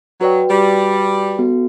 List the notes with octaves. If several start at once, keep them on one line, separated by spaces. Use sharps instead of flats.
F#3 F#4 B4 D5 G5
G3
B3 F#4 A4